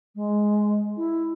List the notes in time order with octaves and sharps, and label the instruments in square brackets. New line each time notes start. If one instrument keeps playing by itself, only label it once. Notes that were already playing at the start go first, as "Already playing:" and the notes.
[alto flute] G#3
E4